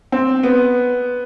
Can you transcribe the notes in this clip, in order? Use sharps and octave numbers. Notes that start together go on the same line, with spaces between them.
C4
B3